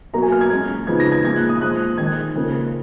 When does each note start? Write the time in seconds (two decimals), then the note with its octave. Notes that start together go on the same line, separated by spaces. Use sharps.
0.13 B2 F#3 A#3 A#5
0.22 G#5
0.32 F6
0.41 G#6
0.51 A#2 G#3 C#4
0.87 C#3 F3 G#3 B3 D#4 G#6
1.00 A#6
1.12 G#6
1.24 A#2 F3 G#3 G#6
1.36 F#6
1.49 D#6
1.61 A#2 F3 G#3 F#6
1.98 D#3 G#3 D#4 G#6
2.35 C#3 F3 A#3 C#4